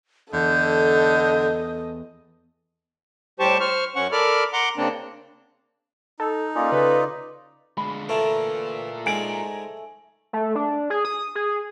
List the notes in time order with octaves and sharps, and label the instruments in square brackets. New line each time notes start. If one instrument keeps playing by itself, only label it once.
[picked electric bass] E2 [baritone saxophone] D3 [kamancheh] A4 D#5 [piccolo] G6
[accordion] A2 G3 G4 C5 A5 C#6
C5 C#6 F6
F#2 C#4 F#5 C#6
A4 A#4 D5 B5 D6 F6
F#5 A#5 C6 D6
C#3 A#3 C4 D4
[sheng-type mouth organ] D#4 [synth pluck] A4
[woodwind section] A#3 C#4 [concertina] F4 D5 D#5
[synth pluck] C#3 [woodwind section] C#4 A4 B4
[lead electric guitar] D3 G#3 [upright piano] B5
[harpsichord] D3 E3 D4 [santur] A3 [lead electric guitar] F4 A#4
[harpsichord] G#2 G#3 D5 [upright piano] G#5 D7
[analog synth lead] A3
D4
G#4
D#6
G#4